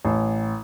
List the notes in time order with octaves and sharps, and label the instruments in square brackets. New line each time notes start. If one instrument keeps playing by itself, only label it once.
[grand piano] A1